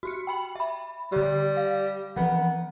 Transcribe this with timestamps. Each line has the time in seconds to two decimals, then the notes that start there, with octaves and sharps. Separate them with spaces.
0.03 F#4 G4 C#7
0.27 G5 B5 F#7
0.55 E5 B5
1.12 D3 G3 G4
1.57 F5
2.16 E3 F3 B3 C4